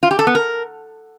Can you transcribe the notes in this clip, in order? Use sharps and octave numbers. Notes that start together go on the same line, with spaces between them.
F4
G4
A4
B3
A#4